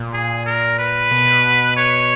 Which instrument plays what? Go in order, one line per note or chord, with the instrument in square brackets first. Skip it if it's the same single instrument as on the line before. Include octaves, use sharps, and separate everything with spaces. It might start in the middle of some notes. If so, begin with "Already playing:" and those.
Already playing: [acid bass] A#2
[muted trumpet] G#4
A#4
B4
[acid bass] B2
[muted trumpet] C#5